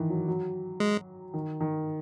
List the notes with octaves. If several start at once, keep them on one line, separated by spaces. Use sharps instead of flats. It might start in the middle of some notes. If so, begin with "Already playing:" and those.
Already playing: D#3 E3
F#3
F#3
G#3
D#3
D#3